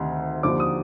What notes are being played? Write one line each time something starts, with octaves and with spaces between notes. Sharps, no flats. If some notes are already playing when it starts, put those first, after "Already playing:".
Already playing: D2 C3 D#3
D#2 D3 F3 D6
D#6